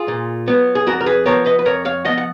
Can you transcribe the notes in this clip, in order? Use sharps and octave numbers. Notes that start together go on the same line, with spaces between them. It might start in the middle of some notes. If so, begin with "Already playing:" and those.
Already playing: F4 G#4
A#2
F#3 B3
G#4
F2 F#4 A#4
A#4
G#4 B4
F3 B3 A#4 C#5
B4 D#5
B4
F2 A#4 C#5
C#5 F5
F3 B3 D#5 F#5
F#5